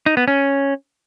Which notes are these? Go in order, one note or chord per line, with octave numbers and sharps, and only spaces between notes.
D#4
B3
C#4